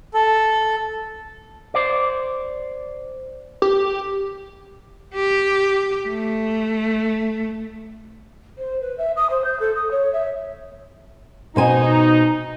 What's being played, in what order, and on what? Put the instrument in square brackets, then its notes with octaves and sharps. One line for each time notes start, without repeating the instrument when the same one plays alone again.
[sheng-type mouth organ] A4
[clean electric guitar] C5 D5
[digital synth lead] G4
[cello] G4
A3
[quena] C5
B4
E5
D#6
C5
G6
A4
D#6
C#5
E5
[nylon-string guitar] B2 C5 G#5 [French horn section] D#4